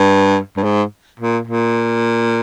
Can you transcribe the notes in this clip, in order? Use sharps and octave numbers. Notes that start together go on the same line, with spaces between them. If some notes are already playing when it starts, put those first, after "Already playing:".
Already playing: G2
G2
G#2
A#2
A#2